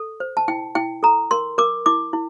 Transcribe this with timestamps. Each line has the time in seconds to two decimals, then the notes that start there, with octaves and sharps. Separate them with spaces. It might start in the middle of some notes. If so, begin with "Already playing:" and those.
Already playing: A4
0.20 C5
0.37 A5
0.48 E4 G5
0.75 E4 G5
1.03 A4 A#5
1.31 A#4 C6
1.58 A#4 D6
1.86 E4 D6
2.13 E4